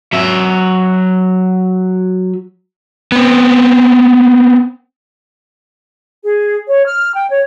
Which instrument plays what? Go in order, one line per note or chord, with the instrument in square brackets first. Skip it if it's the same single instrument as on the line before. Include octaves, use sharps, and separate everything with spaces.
[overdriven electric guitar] F#3 E5
[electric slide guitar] B3 C4
[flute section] G#4
C#5
F6
G5
C#5